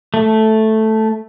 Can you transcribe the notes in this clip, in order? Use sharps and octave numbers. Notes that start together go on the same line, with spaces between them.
A3